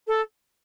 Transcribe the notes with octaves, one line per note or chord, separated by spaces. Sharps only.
A4